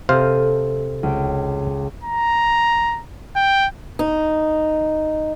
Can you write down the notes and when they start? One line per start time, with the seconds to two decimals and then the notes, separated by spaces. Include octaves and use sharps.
0.09 C3 A4 C5 F5 D#6 F6
1.03 C#2 G5
2.04 A#5
3.36 G5
3.99 D#4